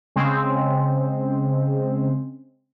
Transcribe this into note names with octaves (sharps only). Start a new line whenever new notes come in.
C#3 G#3 C4